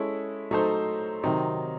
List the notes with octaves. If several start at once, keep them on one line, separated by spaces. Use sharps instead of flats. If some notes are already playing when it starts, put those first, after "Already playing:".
Already playing: G#3 C#4 E4 A4
F#3 A3 D#4 A4 C5
C3 D#3 F#3 C4 D#4